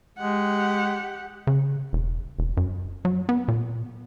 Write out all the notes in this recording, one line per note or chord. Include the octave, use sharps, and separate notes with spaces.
G#3 G4 F#5
C#3
E1
E1
F#2
F#3
B3
A#2